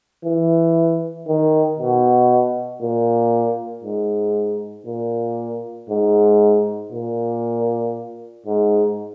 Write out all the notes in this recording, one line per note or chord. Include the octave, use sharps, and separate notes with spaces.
E3
D#3
B2
A#2
G#2
A#2
G#2
A#2
G#2